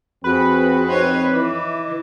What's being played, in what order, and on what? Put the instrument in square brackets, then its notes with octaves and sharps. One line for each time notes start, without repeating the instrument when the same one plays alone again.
[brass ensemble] F2 C4 [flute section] F#4 G#4 [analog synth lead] B4
[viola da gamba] D#4 C5 C#5
[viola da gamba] E3 [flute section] E4 D#5 D6